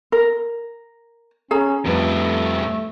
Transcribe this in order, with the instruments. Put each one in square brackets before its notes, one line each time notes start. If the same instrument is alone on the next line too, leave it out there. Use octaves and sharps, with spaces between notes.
[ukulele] A#4
[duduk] C#4 [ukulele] G#4 A#5
[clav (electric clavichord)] F2 B4 [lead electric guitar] A2 G3 [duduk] A3